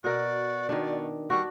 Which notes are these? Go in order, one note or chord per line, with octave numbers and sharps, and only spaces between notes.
B2 F#4 A#4 D5
B2 D#3 D4
G3 D4 F#4 C#6